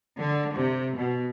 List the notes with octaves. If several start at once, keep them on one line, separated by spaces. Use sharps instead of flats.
D3
C3
B2